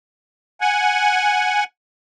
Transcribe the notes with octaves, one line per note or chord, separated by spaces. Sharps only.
F#5 G#5